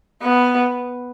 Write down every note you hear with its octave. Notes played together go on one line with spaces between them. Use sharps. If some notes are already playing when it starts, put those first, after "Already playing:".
B3